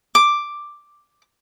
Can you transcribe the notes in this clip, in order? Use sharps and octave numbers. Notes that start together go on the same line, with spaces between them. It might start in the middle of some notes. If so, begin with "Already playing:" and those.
D6